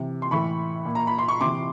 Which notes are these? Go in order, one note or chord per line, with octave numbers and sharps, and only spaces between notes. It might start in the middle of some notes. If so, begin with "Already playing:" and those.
Already playing: C3 E3
C6
A2 E3 B5 C#6
A#2
A#5
B5
C6
C#6
C3 E3 C6 D6